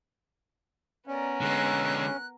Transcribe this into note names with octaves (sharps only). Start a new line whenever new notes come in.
B3 C#4 A#4 D5
D3 G#3 F#6